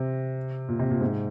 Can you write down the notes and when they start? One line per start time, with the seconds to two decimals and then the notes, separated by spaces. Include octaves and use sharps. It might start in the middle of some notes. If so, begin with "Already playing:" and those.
Already playing: C3
0.68 A#2
0.79 C3
0.90 A#2
1.01 G#2